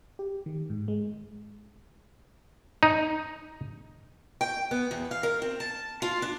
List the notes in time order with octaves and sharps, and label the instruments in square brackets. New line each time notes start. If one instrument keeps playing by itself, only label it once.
[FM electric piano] G4
D#3
G#2
G#3
[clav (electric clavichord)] D#4
[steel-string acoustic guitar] G5
B3
E2
F5
A#4
C4
A5
F4
D4